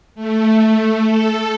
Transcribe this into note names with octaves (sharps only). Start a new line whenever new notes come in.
A3
A4